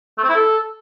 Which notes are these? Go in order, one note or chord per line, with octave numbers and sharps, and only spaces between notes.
A3
C4
E4
A4